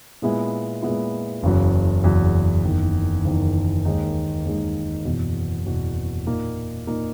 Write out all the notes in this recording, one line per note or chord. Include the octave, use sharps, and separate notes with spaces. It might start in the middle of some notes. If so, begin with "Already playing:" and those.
A#2 G#3 B3 E4
A#2 G#3 B3 E4
F#1 E2 C#3 F#3
F#1 E2 C#3 F#3
F#1 E2 D#3
F#1 E2 D#3
D#2 D#3 G#3 D#4
D#2 D#3 G#3 D#4
F#1 E2 B2
F#1 E2 B2
A#2 A#3 D#4
A#2 A#3 D#4